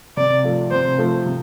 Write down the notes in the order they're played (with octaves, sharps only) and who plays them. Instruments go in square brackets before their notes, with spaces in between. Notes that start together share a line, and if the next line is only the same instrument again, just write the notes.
[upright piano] C3 [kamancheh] D5
[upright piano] F3 A3
[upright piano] C3 [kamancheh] C5
[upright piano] F3 A3
C3